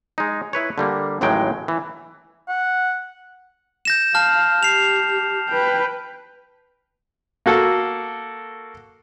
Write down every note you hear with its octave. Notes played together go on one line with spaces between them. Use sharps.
G#3 D#4
E4 B4 C#5
D3 G3 A#3
A1 D#2 A2 F#3 G#3 G5
E3
F#5
G6 A#6 E7
F5 A5 F6
G4 C7 F7
B4 G5
A#3 F#4 A4